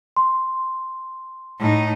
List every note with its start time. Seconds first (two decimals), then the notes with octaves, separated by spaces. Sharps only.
0.16 C6
1.60 A2 D#4